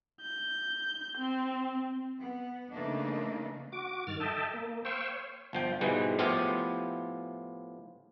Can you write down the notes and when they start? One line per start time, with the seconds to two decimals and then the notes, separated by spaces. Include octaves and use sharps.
0.21 G6
1.18 C4
2.19 B3
2.71 C#3 E3 A3 A#3 D4 D#4
3.72 F#4 D6
4.07 G2 D#3 F6 A6
4.20 A4 D#5 E5 G5 A5
4.54 A#3
4.85 C5 F5 G5 C#6 E6
5.08 C#5
5.53 G1 F3 G5
5.81 G#2 B2 E3 G3 G#3
6.19 A2 F3 B3 E4 F4 G4